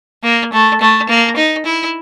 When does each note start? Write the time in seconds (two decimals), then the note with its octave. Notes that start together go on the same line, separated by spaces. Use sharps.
0.23 A#3
0.53 A3
0.81 A3
1.09 A#3
1.36 D#4
1.66 E4